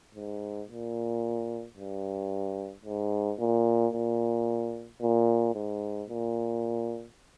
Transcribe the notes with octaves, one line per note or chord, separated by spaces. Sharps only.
G#2
A#2
G2
G#2
A#2
A#2
A#2
G#2
A#2